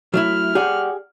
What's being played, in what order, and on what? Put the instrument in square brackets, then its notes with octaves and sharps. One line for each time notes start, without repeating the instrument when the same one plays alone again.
[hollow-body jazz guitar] F#3 A3 E4 [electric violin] F6
[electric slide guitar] G4 D5 F#5 [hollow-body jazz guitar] G#4